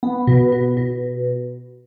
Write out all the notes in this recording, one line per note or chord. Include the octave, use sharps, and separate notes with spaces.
B3
B2
B2
B2